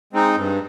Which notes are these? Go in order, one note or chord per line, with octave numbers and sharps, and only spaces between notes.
G#3 C4 D#4
G2